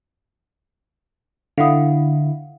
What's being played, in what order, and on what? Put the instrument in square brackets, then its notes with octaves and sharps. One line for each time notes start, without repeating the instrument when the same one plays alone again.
[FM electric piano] D3 E4 [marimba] F5 F#5 D#6